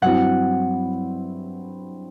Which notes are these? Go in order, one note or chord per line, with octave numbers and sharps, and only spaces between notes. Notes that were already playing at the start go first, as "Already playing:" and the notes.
G2 F#3 C4 E4 F#5